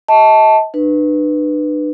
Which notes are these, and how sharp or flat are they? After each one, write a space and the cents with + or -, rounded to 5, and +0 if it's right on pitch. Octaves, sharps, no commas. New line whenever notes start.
D#5 +40 A5 +0
D4 +40 B4 +0